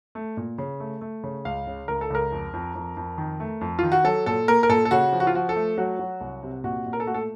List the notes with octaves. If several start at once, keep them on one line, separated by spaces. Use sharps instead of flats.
A3
A#2
C#3
A3
A3
C#3
C#2 F5
C#3
C#2 A#4
A4
C#2 A#4
F2
F2
F2
F2
D#3
A3
F2
D#3 F4
F#4
F#3 A4
A#2 A4
A#3 A#4
A#4
A#2 A4
A4
C#3 F#4
F3
F#4
F4
F3 F#4
A4
A3
F#3 F#4
F#3
C2
C3
A#2 F#4
A#2
A#4
A4
A3 F#4
A4